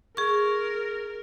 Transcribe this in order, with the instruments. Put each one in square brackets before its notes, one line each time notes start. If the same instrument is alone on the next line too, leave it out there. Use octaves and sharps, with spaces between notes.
[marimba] G#4 C#6 [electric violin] A#4